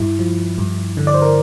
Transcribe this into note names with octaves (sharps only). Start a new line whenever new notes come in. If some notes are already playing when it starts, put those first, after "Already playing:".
Already playing: G2 E4
F3
G2
D3
D5
C5
A#4